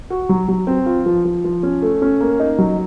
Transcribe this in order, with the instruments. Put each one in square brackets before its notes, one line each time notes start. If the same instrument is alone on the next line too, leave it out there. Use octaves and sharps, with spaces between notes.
[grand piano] F#4
F#3
F#3
C4
F4
F3
F3
F3
C#4
A3
C#4
A#3
D#4
F#3